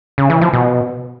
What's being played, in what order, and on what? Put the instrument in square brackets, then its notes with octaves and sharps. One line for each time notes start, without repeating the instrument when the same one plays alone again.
[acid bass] C#3
E3
F3
B2